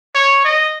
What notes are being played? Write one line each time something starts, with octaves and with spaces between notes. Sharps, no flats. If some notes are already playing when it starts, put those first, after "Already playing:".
C#5
D#5